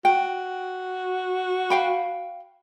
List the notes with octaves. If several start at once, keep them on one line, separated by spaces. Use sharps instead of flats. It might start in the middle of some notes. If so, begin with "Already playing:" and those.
F#4 G5
F5 G5 B5